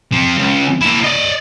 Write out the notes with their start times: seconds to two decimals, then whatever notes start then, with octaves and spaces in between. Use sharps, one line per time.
0.12 F3 C4
0.38 C#2 C#3
0.81 A#3 E4
1.04 D5 D#5